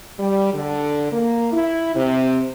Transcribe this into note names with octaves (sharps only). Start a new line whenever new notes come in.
G3
D3
A#3
E4
C3